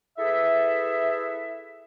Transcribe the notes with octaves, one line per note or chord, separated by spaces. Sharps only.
E4 G#4 A4 B4 E5